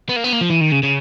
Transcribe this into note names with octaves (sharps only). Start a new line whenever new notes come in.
B3
A#3
B3
A#3
F3
E3
D#3
C#3
C#3